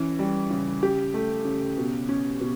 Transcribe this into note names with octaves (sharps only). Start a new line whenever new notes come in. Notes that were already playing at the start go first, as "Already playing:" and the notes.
Already playing: E3 C#4
G3
C#3
C#3 G4
A3
C#3
B2
C#4
B2